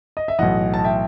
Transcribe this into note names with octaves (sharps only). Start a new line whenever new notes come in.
D#5
E5
B1 A2 E3 D#5 F#5
A5
E5 G5